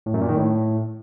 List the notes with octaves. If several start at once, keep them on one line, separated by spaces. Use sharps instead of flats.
A2
F#2
A#2
D#3
A2